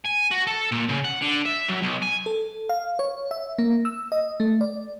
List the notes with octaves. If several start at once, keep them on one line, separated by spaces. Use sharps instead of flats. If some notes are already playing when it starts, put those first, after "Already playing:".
G#5
F#4
A4
A#2
C#3
F#5
D3
E5
F#2
B1
G#5
A4
F5
C#5
E5
A#3
E6
D#5
A3
D5